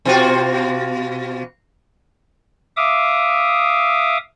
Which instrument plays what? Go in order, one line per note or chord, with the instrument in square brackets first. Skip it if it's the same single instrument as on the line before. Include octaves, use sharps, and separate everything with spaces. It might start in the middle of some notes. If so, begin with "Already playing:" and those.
[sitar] B2 F4 F#4
[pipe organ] E5 F5 D6 D#6